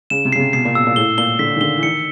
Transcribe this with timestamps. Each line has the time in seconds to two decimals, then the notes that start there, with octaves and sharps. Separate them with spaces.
0.10 C#3 E7
0.25 C3
0.32 C#3 C7
0.39 C3
0.53 B2 C7
0.65 A#2
0.75 B2 E6
0.87 A#2
0.96 A2 G7
1.18 A#2 G7
1.39 D3 B6
1.56 D#3
1.61 D3 G7
1.78 E3
1.83 D#3 C#7